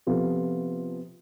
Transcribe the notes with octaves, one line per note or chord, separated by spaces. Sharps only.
C3 F3 B3 F4 A4